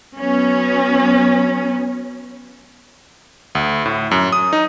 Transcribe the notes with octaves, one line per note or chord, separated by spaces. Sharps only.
F#3 B3 C#4
D2
A2
F#2
D#6
D#4